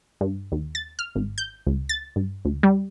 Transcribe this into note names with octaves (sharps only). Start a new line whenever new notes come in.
G2
D#2
A6
F6
G#1
G6
C#2
A6
G2
D2
G3